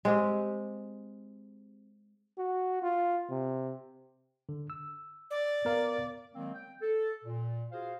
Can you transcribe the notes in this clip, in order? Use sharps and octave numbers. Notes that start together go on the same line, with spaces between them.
G#3 C4 G4
F#4
F4
C3
D3
E6
D5
B3 A#4 F5
D#3 F#3 G#3 A#3 C4
G5
A4
A#2
F4 F#4 G#4 C5 F5